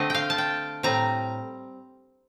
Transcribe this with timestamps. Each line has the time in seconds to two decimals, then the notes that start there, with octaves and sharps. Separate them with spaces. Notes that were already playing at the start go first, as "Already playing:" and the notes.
Already playing: D3 A3 C4 D#5
0.10 F5 G5
0.30 A5
0.38 G5
0.83 A2 G3 C4 A#5